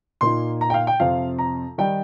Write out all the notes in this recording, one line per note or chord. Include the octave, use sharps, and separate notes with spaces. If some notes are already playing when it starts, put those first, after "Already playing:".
A#2 A#3 D#4 C6
A#5
G5
F5
G5
F2 C3 F3 C4 F4 F5
A#5
D#3 G3 D#4 G5